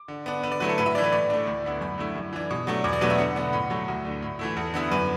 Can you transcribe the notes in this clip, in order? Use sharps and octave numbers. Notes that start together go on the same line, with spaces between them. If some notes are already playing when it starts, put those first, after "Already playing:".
Already playing: D6
D3
B3 D4
D3 B4
D5
F#3 A3 E4 B4
A4
A2 B4
E5
E3 D4 D5
B4
A2 D5
A3 D4
D2
D3 B3 E4
F#2 B5
D3 A3 E4
F#2
E3 D4
B2
F#3 A3 D4
E2 D6
D5
B2 F#3 A3 D4 B4
E5
D3 F#5
B3 D4
A2
F#3 A3
D2 F#4
D3 A3 D4
A2
E3 A3 E4
E2 A4
D3 B3 E4
F#2 B4